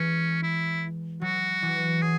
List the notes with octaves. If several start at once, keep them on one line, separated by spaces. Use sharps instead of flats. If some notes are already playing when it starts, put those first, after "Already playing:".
Already playing: E3 G#3 C#4
E4
F#3 F#4
E3
F#3 G#4